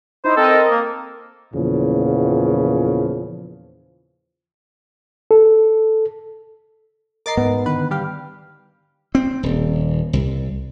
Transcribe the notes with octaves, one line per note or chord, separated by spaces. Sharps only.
D#4 E4 C5
C4 A4 A#4 D#5
A#3
E2 A#2 C#3 F3
A4
A#4 D#5 A#5 D6 A6 C7
G#2 B3
D3 D#3 B4
G3 G4 F5
C4
D#1
C2